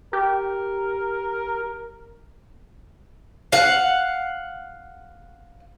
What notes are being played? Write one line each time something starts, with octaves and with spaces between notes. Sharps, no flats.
G4 A#4
F5 F#5